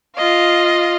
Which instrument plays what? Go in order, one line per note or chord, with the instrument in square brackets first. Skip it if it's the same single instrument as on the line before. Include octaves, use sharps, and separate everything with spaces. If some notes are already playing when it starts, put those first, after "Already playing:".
[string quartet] F4 D#5 F5